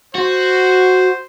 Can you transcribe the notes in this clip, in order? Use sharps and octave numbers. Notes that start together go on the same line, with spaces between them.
F#4 C5